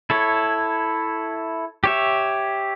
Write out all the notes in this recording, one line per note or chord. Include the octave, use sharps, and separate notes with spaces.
E4 A4 C#5
G4 C#5 E5